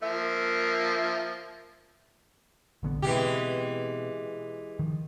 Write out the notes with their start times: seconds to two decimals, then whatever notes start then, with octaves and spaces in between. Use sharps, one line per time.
0.03 F3 A#3 E5
2.83 A#1 D3 B3
3.02 B2 E3 G#3 B3 C4 G4
4.79 D#3 F3